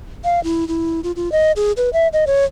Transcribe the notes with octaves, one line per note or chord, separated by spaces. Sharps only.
F5
E4
E4
F4
F4
D#5
G#4
B4
E5
D#5
C#5